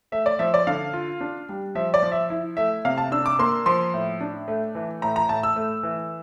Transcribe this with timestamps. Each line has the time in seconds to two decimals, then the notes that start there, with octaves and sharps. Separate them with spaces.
0.12 A3 E5
0.26 D5
0.39 F3 E5
0.54 D5
0.67 D3 F5
0.93 F4
1.21 D4
1.49 G3
1.75 F3 E5
1.94 D5
2.03 F3
2.12 E5
2.30 E4
2.57 A3 E5
2.85 C3 F5
2.98 A5
3.12 D4 E6
3.26 D6
3.39 A#3 C6
3.66 F3 C6
3.94 A2
4.21 D4
4.48 A3
4.75 E3
5.02 A2 A#5
5.16 A#5
5.29 A2 A5
5.43 E6
5.56 A3
5.83 E3